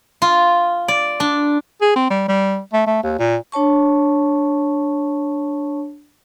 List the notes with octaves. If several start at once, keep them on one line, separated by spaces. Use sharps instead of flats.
F4
D5
D4
G#4
C4
G3
G3
A3
A3
D#2
A#2
D4 C#5 A5 C#6